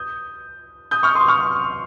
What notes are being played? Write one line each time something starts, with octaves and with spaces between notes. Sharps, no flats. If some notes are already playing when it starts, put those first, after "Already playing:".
Already playing: D#6 G6
D#6 G6
C#6 F6
C6 D#6
C#6 F6